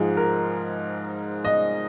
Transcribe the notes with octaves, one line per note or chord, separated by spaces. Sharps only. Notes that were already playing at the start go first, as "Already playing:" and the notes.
Already playing: G#2 F3 G#3 G#4
A#4
D#5